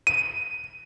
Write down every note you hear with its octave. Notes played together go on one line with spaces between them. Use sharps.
D#7